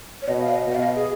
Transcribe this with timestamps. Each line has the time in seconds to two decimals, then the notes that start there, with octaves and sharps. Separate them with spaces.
0.22 C#5
0.28 B2 D#5
0.41 F5
0.49 C#5
0.54 D#5
0.67 B2 D#5
0.75 F5
0.82 D#5
0.96 G#4